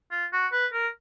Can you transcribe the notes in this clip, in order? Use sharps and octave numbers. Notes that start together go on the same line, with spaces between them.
F4
F#4
B4
A#4